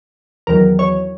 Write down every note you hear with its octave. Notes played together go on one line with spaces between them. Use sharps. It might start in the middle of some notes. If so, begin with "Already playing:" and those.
E2 D#3 F#3 A#4
C#5